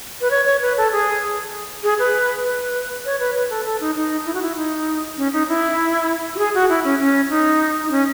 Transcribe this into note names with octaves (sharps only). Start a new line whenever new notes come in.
B4
C#5
C#5
B4
A4
G#4
G#4
B4
B4
C#5
B4
B4
A4
A4
D#4
D#4
E4
F#4
E4
D#4
C#4
D#4
E4
F#4
G#4
F#4
E4
C#4
C#4
D#4
D#4
C#4